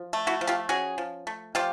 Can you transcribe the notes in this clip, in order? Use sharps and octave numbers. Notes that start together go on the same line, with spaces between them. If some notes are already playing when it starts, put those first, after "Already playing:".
Already playing: F3
A3
E4 F#4
F3
F4 G4
C#4 F#4 G#4
F3
A3
F3 F4 G4